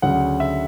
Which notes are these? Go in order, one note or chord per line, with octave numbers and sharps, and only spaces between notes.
D2 C#3 F#3 F#5
E5